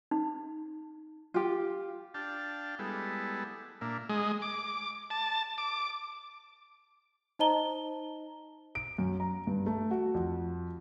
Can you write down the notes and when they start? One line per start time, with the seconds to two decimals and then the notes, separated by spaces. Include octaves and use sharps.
0.11 D#4
1.34 F4 G4
2.14 D4 F5 G5 A5
2.79 G3 G#3 B3 E4 A4
3.81 A#2 A#3 D4 E5
4.09 G#3
4.42 D6
5.10 A5
5.58 D6
7.39 D#4 C5 D#5 A5 A#5 G7
8.75 D7
8.98 F#2
9.20 A#5
9.47 G2
9.66 A3
9.91 F#4
10.15 F2